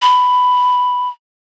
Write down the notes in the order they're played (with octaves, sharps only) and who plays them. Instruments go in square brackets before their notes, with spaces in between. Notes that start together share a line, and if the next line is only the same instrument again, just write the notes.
[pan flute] B5